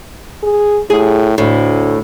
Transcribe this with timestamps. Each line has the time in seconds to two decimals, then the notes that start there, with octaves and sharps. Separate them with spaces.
0.43 G#4
0.90 A2 G#4
1.38 D2 A2